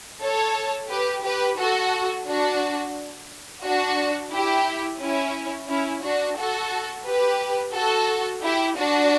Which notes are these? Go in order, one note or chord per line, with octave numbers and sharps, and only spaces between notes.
A4 C#5
G4 B4
G4 B4
F#4 A4
D4 F#4
D4 F#4
E4 G4
C#4 E4
C#4 E4
D4 F#4
F#4 A4
G4 B4
F#4 A4
E4 G4
D4 F#4